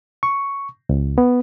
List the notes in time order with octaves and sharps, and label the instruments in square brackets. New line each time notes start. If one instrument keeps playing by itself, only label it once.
[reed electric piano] C#6
C#2
B3